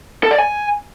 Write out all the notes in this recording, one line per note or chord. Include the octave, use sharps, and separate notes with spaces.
A4
D5
G#5